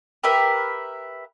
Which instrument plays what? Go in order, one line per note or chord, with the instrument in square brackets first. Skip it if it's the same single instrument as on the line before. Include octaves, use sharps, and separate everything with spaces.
[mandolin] G4 A#4 B4 E5